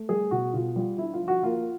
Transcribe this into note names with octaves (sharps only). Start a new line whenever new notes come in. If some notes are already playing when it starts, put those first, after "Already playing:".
Already playing: A3
G3 G#4
B2 F#4
B2 F4
G3 F4
D4 E4
F4
F3
F#4
A#3 F4